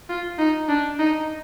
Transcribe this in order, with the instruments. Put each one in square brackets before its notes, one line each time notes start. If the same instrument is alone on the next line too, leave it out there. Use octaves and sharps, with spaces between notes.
[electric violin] F4
D#4
D4
D#4